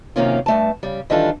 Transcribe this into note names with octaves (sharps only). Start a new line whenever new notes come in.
F#2 C3 D#3 A#3 C#4 F4
G2 A3 A5
C#3 G3
D#3 E3 G3 D4 F4 A4